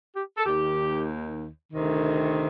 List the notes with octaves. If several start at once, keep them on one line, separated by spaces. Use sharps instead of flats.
G4
A4
D#2 D#3 G4
D2 C3 D#3